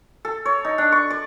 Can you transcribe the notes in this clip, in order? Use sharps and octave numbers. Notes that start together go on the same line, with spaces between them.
A4
C#5
D#4
D4
C#6
D5